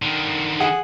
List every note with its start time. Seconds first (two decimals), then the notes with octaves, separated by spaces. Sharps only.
0.02 D3 D#3
0.60 G#4 F#5